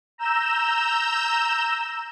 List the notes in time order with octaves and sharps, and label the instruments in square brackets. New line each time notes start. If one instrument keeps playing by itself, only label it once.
[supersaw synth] A#5 E6 G6 E7